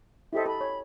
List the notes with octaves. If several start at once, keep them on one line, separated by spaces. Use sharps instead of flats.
E4 G4 A4 C5 D#5 E5
A4 B5
C#5